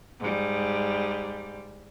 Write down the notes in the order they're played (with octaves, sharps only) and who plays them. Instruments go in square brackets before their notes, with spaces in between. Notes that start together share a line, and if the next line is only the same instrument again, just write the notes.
[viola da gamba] G#2 G3